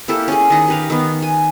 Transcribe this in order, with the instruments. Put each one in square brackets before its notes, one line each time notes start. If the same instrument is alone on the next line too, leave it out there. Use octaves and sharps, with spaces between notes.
[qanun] A#3 E4 G4 A4
C#4 G#4
D#3 D#4
G4 B4 F5
D#3 B3
G#5